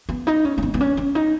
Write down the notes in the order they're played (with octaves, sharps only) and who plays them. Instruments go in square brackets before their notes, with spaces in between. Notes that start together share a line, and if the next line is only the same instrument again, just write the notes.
[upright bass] B3
D#4
C#4
A#3
B3
B3
C#4
C#4
D#4